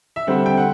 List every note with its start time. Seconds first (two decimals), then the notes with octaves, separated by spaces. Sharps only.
0.16 E5
0.27 D3 G3 C4 F#5
0.46 G5
0.57 F#5